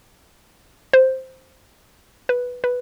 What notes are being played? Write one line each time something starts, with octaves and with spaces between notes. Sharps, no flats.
C5
B4
B4